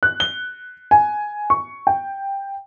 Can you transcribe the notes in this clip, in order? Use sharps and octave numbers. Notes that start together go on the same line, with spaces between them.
F#6
G7
G#5
C#6
G5